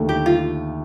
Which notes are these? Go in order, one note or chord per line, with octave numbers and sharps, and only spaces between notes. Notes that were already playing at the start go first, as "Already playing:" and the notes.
Already playing: D#2 D3 A3
G4
F4